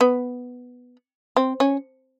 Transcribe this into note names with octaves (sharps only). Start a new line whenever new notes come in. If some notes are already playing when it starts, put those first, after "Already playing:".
B3
C4
C#4